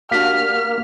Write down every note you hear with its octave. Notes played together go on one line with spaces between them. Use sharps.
A#3 D4 F#4 G4 F5 F6 B6